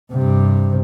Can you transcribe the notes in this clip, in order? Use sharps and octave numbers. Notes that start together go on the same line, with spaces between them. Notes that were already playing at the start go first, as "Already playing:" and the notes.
G2 C3